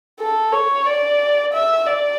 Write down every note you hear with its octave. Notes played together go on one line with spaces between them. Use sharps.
A4
C#5
D5
E5
D5